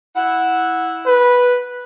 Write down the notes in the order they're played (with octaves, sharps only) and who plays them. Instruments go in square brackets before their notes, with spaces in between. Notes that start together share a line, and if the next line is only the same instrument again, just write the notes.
[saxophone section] E4 F#5
[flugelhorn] B4